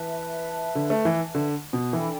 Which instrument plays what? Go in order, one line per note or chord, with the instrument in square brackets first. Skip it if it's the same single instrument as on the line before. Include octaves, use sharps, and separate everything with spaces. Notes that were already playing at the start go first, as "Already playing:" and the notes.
Already playing: [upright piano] E3 [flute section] B4 E5 A5
[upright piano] D3
A3
E3
D3
B2
[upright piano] E3 [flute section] D4 A4 G5 B5